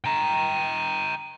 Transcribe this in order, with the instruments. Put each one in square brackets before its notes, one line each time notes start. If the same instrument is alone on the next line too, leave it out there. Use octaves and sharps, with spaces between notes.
[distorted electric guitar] G5 A#5